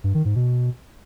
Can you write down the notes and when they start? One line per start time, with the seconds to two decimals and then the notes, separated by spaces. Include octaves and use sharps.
0.04 G2
0.14 D#3
0.25 G#2
0.36 B2